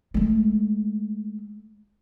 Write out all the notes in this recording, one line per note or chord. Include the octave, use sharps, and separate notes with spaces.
G#3 A3